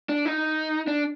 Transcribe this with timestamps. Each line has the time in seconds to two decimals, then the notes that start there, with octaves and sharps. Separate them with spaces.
0.09 D4
0.25 D#4
0.88 D4